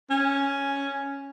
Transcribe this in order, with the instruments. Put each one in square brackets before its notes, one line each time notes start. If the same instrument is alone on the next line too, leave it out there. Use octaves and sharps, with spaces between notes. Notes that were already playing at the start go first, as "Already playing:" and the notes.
[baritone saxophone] C#4